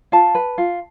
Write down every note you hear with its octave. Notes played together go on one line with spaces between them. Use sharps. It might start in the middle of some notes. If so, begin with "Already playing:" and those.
F4 A5
B4
F4